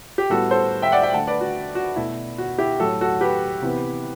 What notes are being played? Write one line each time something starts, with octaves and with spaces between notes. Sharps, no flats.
G4
A2 G3 B3 F#4 A4
A4 C5
E5 G5
D5 F#5
E5 G5
D3 A3 F#5 A5
B4 D5
F#4
F#4
B2 A3 E4
F#4
E4 G4
A2 F#3 A3 F#4 A4
F#4 A4
G4 B4
C3 E3 B3